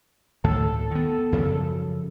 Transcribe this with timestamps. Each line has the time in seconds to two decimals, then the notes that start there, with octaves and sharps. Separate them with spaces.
0.44 D2 A2 D#3 A4
0.91 D#3 B3
1.32 F#2 C#3 F3